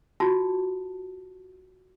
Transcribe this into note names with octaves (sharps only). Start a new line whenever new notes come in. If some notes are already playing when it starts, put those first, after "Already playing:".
F4 F#4 A5